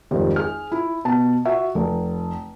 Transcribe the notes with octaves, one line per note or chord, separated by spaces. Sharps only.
G#1 F2 G3
G#4 F6
E4
B2 A5
F#4 E5
F1